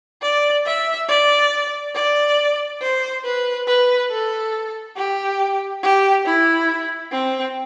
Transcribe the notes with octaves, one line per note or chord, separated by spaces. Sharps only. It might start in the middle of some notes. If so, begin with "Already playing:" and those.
D5
E5
D5
D5
C5
B4
B4
A4
G4
G4
E4
C4